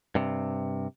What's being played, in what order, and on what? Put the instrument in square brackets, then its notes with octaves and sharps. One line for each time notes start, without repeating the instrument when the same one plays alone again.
[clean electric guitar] G2 C3